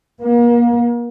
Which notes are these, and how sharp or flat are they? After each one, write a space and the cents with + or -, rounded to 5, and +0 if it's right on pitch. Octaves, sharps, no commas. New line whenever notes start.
A#3 +35